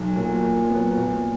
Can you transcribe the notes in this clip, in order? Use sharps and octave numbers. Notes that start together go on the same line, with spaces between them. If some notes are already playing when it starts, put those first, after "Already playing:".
Already playing: B1
A#2 F#3
A#2
F#3 B3
A#2